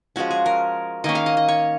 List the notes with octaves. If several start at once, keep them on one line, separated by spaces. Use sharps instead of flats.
F3 G#3 C#4 F#4
G#4
A#4
D#3 A#3 C#4 D#5
F5
D#5
D#5
C#5